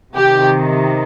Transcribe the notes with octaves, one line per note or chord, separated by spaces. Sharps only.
C3 D#3 G4